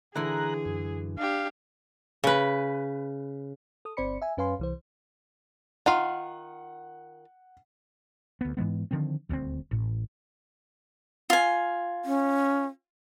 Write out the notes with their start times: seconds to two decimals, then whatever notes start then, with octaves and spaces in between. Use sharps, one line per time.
0.16 D3 E3 G#4 A#5 F#6
0.65 F#2
1.18 D4 G4 F5
2.24 C#3 B4
3.85 A4 D#6
3.97 G1 C4 C5 D5 B5 C#7
4.22 E5 G#5
4.37 F#2 C#4 B4 F5 G#5 C6
4.59 C2 E3 C5
5.86 D#3 F4 F5 F#5
8.41 D2 B3
8.57 G#2 E3 G#3 B3
8.91 D3 D#3 F3 C4
9.29 D#1 D2 G#3 C4
9.71 A1 A2
11.30 F4 G#5
12.05 C#4